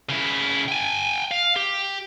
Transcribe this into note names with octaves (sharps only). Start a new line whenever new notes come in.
C#3 E4
G5 G#5
F5
G4